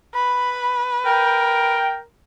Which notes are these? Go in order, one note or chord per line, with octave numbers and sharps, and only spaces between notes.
B4 B5
A#4 G5